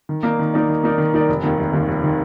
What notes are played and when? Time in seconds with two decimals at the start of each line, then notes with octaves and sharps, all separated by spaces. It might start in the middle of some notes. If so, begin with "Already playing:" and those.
0.09 D#3
0.23 A#3 D#4 A#4 D5
0.39 D#3
0.54 A#3 D#4 A#4 D5
0.69 D#3
0.83 A#3 D#4 A#4 D5
0.98 D#3
1.14 A#3 D#4 A#4 D5
1.28 F1
1.43 D#2 D#3
1.59 F1
1.73 D#2 D#3
1.88 F1
2.04 D#3